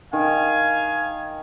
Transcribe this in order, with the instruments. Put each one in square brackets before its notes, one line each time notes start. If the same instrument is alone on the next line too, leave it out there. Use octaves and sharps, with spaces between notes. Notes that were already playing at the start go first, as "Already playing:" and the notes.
[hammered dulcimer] D#3 [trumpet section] F5 G#5